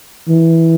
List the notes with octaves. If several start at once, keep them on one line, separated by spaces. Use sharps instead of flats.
E3